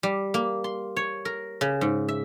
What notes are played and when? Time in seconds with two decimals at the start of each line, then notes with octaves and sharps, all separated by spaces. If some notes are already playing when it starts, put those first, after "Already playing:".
0.03 G3
0.34 A#3
0.64 C6
0.97 C#5
1.25 A#4
1.61 C#3
1.81 G#2
2.08 E5